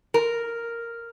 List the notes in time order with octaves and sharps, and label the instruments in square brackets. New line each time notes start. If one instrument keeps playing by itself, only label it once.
[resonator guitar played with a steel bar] A#4